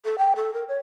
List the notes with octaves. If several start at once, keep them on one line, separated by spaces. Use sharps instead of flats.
A4
G5
A4
A#4
C#5